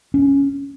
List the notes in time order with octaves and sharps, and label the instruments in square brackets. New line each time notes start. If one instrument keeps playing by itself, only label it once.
[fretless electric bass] C#4